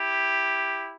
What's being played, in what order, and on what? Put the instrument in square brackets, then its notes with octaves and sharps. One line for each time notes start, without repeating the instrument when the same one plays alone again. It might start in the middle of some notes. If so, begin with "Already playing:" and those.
Already playing: [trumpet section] E4 G4